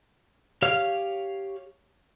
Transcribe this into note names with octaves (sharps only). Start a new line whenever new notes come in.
G4 C#5 F5 F6